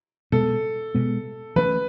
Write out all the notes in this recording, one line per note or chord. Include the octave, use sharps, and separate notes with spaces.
B2 G#3 B3 A4
B2 G#3 B3
E3 A3 C#4 B4